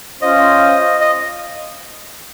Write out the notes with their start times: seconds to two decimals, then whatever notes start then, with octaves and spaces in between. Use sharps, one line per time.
0.21 C#4 F4 C5 D#5 F5
1.01 D#5